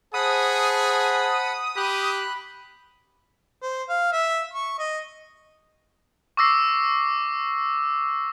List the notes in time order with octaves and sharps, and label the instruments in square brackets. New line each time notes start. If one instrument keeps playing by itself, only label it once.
[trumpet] G#4 [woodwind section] C5 A5 [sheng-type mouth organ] F#5 B5 [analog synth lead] D#6
[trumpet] G4 [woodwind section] B5 [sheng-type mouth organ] F#6
[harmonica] C5
F5
E5
C#6
D#5
[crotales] C#6 D6 E6 A#6 C7